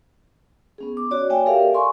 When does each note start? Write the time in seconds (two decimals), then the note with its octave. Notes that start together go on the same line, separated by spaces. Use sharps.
0.78 B3 C#4 G#4
0.97 D6
1.11 F#4 C#5 D5
1.30 A#3 F#4 C#5 E5 G5 G#5
1.46 G4 A4 A#4 D5 E5 F5
1.74 G#5 C6 C#6